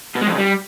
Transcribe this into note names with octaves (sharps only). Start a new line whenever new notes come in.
B2
G#3
F2
C#3
G3